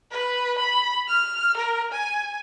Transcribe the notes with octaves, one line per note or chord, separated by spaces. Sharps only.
B4
B5
F6
A#4
G#5